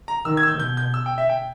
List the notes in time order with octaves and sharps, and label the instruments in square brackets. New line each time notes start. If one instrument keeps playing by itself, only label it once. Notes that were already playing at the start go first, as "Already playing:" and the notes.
[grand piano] A#5
[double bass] D#3 [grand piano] E6
[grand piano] G#6
E6
G6
[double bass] B2 [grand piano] G6
[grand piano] G6
E6
G5
E5
G5